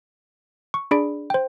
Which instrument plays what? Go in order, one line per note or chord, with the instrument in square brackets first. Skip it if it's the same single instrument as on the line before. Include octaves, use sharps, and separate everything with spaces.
[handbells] C#6
D4 G#4 D5 B5 D7
C5 G5